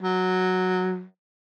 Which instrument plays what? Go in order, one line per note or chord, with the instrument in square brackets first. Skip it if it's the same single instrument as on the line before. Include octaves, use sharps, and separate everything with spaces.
[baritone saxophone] F#3